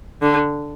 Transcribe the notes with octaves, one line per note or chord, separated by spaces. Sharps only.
D3